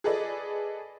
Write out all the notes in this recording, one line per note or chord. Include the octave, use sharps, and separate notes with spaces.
G#4 A4 B4 D5 D#5